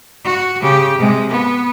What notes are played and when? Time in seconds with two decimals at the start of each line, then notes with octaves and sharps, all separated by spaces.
0.25 F#4
0.61 C#3 G4
0.98 C3 G#3
1.29 B3